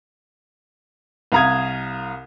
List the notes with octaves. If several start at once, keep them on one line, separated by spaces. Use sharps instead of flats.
C2 F5 A#5 D#6 G#6